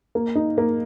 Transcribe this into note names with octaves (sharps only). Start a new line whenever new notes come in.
A#3
D#4
A#3